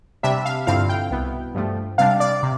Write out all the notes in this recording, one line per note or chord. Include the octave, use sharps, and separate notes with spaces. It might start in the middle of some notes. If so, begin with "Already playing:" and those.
C3 G3 D4 E5
F5
G2 D3 F3 C4 E4 F5
G5
C2 B2 B3 E4
G2 F3 A3
C3 G3 D4 F5
D5
C3